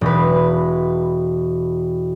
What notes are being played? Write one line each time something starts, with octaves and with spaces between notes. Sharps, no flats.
E1 B4